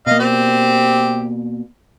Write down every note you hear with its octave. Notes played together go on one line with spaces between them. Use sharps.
B2 A#3 D#5 F5
C4 G4